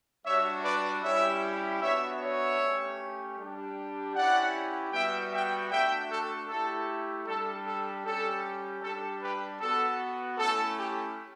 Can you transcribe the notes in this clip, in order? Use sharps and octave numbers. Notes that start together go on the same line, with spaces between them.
G3 D4 F#4 C#5 E5
B4 D5
G3 C#4 E4 G4 C#5 E5
B3 D4 F#4 C#5 E5
C#5 E5
A3 C#4 G4
G3 D4 G4
C#4 E4 G4 D5 F#5
G3 B3 F#4 E5 G5
E5 G5
A3 D4 F#4 E5 G5
A4
A3 E4 G4 A4
G3 D4 G4 A4
A4
G3 C#4 G4 A4
G3 D4 G4 A4
G4 B4
B3 F#4 A4
A3 C#4 E4 A4
G4